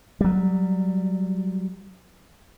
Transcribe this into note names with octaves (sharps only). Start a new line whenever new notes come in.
F#3 G3